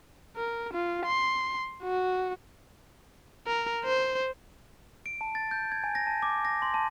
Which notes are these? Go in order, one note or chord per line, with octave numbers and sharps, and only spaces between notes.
A#4
F4
C6
F#4
A#4
C5
D7
A5
A6
G6
G#6
G#5
A#6
A5
D6
A#6
C6
A5